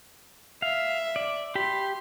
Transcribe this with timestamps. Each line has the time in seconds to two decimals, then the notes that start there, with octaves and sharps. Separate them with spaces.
0.62 E5 F5
1.16 D5
1.55 G4 B5 C6